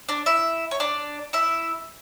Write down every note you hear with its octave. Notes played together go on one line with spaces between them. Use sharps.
D4 D5
E4 E5
C#5
D4 D5
E4 E5